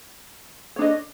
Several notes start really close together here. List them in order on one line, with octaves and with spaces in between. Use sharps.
C#5 D4 D#5